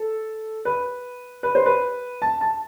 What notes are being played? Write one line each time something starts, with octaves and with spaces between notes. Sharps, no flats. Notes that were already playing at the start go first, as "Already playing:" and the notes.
Already playing: A4
B4
B4
C5
B4
A5
A5